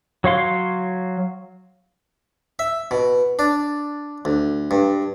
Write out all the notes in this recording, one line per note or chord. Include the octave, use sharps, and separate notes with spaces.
F#3 C#5 F5 C6
E5
B2
D4
D2
G2